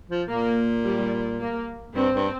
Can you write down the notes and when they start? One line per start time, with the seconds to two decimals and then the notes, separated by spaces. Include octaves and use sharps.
0.10 F3
0.29 A#2 A#3
0.85 G3
1.40 A#3
1.95 G2 C4
2.14 G2